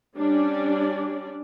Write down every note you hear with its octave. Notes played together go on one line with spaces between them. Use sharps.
G3 C#4 D4 D5